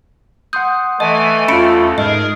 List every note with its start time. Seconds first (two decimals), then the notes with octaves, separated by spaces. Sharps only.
0.53 F#5 C6 D#6 G6
1.00 E3 A3 D#5 G#5
1.48 E2 C#4 F4 B5 C#7 D7
1.98 G#2 G#4 A#4 D#5